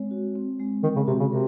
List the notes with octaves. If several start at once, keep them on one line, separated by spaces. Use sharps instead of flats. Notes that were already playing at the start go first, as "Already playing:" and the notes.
Already playing: G#3 C4 C#5
F#4
C4
G#3
D#3 G#3
C#3
C3 F#4
C#3
C3 A#4